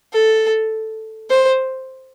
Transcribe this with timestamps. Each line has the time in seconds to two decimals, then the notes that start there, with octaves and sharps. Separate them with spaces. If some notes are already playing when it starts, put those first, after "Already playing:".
0.13 A4
1.30 C5